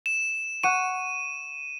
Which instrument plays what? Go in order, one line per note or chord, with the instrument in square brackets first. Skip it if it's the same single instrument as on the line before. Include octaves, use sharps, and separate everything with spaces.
[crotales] E7
[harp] F#5 C#6 [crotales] D#7 E7